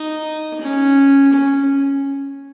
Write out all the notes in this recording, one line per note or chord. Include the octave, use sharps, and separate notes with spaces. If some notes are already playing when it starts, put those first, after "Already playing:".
Already playing: D#4
C#4
C#4